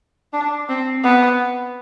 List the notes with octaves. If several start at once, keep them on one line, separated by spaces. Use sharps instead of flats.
D4
C4
B3